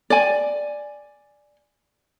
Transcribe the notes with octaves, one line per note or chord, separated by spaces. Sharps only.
D5 G#5